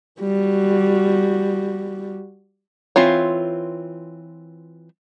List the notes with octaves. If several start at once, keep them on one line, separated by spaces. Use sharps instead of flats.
G3 F#4
E3 C4 F4 C#5